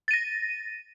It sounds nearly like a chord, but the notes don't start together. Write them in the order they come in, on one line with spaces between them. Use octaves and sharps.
A6 D#7 A#6